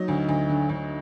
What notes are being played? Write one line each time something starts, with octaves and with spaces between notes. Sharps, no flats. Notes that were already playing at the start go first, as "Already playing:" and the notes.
Already playing: F#3 D#4
D2
D2
D3
D2